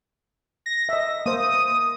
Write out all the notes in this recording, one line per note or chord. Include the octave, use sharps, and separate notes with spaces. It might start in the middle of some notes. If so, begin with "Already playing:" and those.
A#6
D#5 E5
A#3 C5 D#6